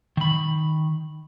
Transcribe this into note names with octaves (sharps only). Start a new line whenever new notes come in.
D#3 B5